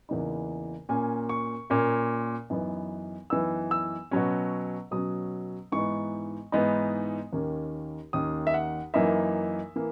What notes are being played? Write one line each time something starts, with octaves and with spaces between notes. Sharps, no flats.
E2 C#3 E3 A#3 D#4
A#2 A#3 C#4 G#5
C#6
A#2 A#3 C#4
F#2 E3 B3 D#4
F#2 E3 B3 D#4 E6
E6
B2 F#3 C#4
B2 F#3 C#4 D#6
G#2 E3 B3 D#4 C#6
G#2 E3 B3 D#4
D#2 D#3 A#3 C#4
D#2 D#3 A#3 C#4 D#6
E5
F#5
F#2 E3 A#3 D#4 E5
E3 A#3